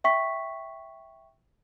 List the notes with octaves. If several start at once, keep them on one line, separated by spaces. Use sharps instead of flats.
E5 G5 C#6 B6